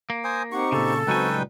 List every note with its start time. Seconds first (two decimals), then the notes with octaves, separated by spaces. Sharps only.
0.10 A#3
0.24 C5 G#5 D#6
0.52 C4 D#4 G4 F#5 C#6
0.72 A#2 C#3 A4
1.07 C#2 F#3 C4 D#4 F#4 B4 G5 G#5
1.31 A#2 G3